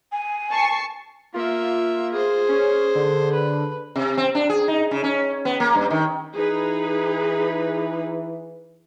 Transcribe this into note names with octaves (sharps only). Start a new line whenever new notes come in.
G#5
A5 C#6 C7
A#3 F4 E5
G#4 C5
C#4
D3
B4
C3
C4
D4
G#4
D#4
C#3
C#4
B3
A#3
G2
D#3
E3 D#4 G#4 B4